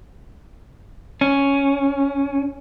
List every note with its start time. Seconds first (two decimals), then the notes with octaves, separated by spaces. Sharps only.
1.21 C#4